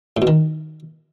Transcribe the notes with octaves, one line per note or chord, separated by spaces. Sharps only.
A2
B2
D#3